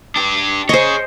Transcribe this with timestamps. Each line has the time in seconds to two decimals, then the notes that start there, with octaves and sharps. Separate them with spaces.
0.16 D4 G4
0.69 G#4 C5 C#5 D#5